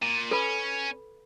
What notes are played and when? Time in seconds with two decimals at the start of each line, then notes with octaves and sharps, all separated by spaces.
0.02 A#2
0.31 C#4 A4 B4 B5